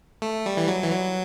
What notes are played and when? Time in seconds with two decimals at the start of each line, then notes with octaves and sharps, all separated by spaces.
0.22 A3
0.46 G3
0.57 E3
0.68 F#3
0.83 E3
0.91 F#3